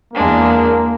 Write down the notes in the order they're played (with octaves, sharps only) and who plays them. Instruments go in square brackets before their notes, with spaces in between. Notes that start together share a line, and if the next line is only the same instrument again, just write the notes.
[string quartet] E2 G#3 D4 [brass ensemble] A#3